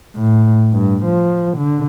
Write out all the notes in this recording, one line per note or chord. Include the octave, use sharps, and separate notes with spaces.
A2
G2
F3
D3